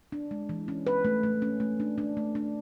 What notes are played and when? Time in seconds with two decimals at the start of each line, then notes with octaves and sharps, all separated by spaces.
0.12 D4
0.31 G#3
0.49 E3
0.68 C#4
0.87 B4
1.05 A3
1.23 A3
1.42 C#4
1.60 A3
1.80 D4
1.98 D4
2.17 A3
2.35 D4